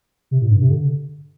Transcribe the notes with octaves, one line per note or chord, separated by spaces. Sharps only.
C3
A2
G2
C3
D3